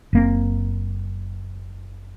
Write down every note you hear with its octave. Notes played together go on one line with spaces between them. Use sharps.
F#1 A#3 C4